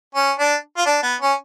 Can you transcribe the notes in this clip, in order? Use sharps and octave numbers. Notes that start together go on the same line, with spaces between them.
C#4
D4
F4
D4
B3
C#4